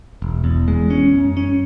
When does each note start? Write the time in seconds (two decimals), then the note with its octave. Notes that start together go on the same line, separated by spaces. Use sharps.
0.22 E1
0.44 E2
0.68 G#3
0.90 C#4
1.13 F#2
1.37 C#4